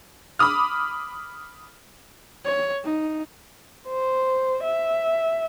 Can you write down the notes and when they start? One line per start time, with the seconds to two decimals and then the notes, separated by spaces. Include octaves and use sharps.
0.39 B5 D6 D#6 F6
2.45 C#5
2.84 D#4
3.88 C5
4.63 E5